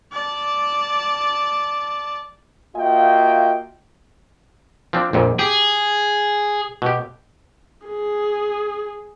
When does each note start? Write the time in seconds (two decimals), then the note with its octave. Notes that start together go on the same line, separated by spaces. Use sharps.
0.13 D5 A5
2.77 A#3 F4 F#4 D#5 E5 G5
4.93 F3 C4 D4
5.13 A#1 F2 A#2
5.39 G4 G#4
6.82 B2 G4
7.86 G#4